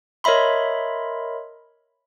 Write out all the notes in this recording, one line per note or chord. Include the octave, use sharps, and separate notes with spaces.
A#4 C#5 D#5 E5 B5 C6